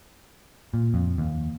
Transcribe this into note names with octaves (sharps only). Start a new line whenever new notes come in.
A#2
F2
D#2